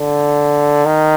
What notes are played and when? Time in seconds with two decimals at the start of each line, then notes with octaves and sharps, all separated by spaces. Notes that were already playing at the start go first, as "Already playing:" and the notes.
Already playing: D3
0.86 D#3